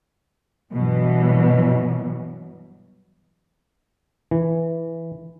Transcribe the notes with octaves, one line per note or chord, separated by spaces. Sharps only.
G2 B2 E3 F#3
E3